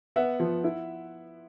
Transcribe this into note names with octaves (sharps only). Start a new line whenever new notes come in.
B3 E5 F#5
F3
E4